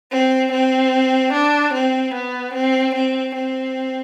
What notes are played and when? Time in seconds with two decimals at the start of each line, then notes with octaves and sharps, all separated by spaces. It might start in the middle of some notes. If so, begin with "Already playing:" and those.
0.11 C4
0.52 C4
1.33 D4
1.73 C4
2.14 B3
2.54 C4
2.94 C4
3.35 C4